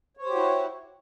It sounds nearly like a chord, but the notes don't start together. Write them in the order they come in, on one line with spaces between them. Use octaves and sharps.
C#5 C5 G4 F#4 E4